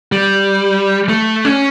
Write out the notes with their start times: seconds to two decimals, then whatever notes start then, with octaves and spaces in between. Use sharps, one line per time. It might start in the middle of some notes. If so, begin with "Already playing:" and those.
0.12 G3
1.09 A3
1.45 C#4